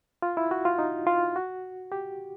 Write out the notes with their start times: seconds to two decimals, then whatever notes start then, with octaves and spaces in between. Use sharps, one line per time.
0.22 F4
0.37 E4
0.51 F#4
0.65 F4
0.79 D#4
1.07 F4
1.36 F#4
1.92 G4